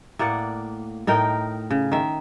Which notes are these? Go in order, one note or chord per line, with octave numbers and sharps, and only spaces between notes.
A2 A#3 D5 F#5
A2 D#4 A#4 G5
C#3
D#3 E5